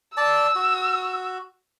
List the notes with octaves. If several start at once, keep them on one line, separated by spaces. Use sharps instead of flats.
D5 A5 E6
F#4